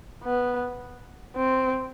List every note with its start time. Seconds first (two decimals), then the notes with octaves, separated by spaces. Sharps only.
0.24 B3
1.36 C4